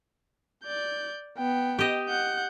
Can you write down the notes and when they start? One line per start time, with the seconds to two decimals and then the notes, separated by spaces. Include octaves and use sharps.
0.64 D5 G6
1.38 B3 G5
1.79 G4 D#5
2.09 F#5 G6